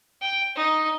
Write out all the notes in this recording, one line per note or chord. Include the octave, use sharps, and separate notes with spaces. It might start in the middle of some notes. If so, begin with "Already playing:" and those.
G5
D#4